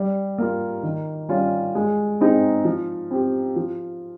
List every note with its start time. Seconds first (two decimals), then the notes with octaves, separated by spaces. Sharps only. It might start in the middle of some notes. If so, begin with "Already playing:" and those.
Already playing: G3
0.38 A#3 F4
0.83 D#3
1.29 G3 C#4 F4
1.75 G#3
2.21 C4 D#4 G#4
2.65 F3
3.11 C4 G4
3.56 F3